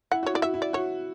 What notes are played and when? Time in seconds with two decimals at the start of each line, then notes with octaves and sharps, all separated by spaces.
0.12 E4 F#5
0.23 F#4 C#5
0.34 E4 D5
0.42 F#4 E5
0.54 E4
0.62 D5
0.73 F#4 C#5